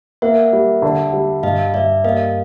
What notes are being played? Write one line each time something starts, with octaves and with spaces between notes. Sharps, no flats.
A#3 E5 F#5
G3
D3
G3
G2 D#5 F5
G2 D5 E5
A#3 D#5 F5